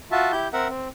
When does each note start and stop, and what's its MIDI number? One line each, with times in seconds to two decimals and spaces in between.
0.11 0.32 65
0.11 0.32 66
0.11 0.32 76
0.11 0.32 81
0.32 0.48 64
0.32 0.48 67
0.32 0.48 91
0.53 0.68 60
0.53 0.68 70
0.53 0.68 76
0.53 0.68 78
0.69 0.88 60